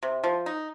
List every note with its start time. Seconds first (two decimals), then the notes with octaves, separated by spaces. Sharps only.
0.03 C3
0.24 F3
0.46 D#4